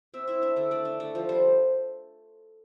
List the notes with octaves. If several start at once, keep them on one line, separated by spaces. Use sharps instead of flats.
C4 E5
E4 E5
D4 E5
D3 E5
A3 D5
D4
A3
F3
G3 C5